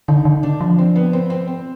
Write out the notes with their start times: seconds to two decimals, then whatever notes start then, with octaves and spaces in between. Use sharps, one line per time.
0.08 D3 D#4
0.25 D3
0.43 D4
0.61 F3
0.78 C4
0.96 B3
1.13 C4
1.30 C4
1.48 C4